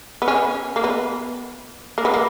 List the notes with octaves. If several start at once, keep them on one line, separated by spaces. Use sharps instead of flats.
B3
C#4
A#3
B3
A#3
B3
A#3